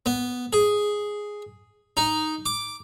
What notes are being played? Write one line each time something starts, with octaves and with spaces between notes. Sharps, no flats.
B3
G#4
D#4
D6